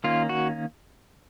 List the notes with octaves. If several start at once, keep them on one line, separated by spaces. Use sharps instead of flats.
D#3 A#3 C#4 F4
F#4